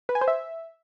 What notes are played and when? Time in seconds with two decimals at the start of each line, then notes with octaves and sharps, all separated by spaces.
0.09 B4
0.15 G#5
0.21 C5
0.28 E5